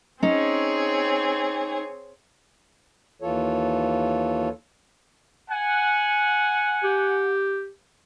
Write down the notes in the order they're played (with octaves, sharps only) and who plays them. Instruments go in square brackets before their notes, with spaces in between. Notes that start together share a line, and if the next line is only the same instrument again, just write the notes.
[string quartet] C4 G#4 C#5 [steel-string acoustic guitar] C#4 D#4
[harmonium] D#2 E3 F4 A4 C#5
[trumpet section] F#5 G#5
[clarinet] G4